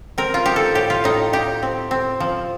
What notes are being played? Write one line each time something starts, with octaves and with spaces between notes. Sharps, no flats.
C4 A#4
F4
D#4 G4
A4
A2 G4
F4
A2 D#4
D#4 G4
C4
C4
F3